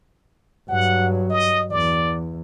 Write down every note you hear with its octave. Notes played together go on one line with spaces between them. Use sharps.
G2 F#3 F#5
D#5
E2 D5